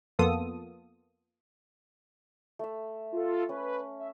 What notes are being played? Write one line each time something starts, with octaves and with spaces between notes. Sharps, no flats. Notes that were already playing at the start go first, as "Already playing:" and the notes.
F2 A#3 B3 F4 A4 D#6
A3 E5
F4 A4
C#4 B4
E5